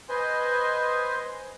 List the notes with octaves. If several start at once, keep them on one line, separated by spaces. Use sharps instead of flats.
B4 C5 D#5 G#5 C6